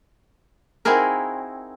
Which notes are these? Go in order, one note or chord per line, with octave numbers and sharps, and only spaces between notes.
C4 D#4 E4 F#4 G#4 A#4